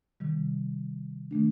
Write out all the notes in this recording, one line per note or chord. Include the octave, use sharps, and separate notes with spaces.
C3 D#3 G3
D#3 A3 D4